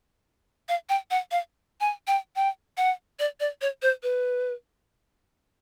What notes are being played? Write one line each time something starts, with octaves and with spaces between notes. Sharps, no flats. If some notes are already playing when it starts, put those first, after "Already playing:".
F5
G5
F#5
F5
G#5
G5
G5
F#5
D5
D5
C#5
C5
B4